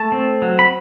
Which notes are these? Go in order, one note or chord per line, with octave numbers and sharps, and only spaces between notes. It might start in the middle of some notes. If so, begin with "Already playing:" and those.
Already playing: A3 A5
C4
F#3
B5